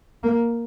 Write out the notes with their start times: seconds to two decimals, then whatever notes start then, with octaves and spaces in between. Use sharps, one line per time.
0.23 A#3